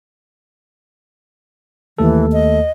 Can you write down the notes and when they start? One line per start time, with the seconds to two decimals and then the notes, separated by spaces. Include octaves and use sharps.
1.98 D#2 E3 A3 A4
2.33 D#5